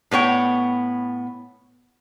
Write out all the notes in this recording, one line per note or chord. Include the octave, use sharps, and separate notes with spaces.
A2 B3 C#5 G5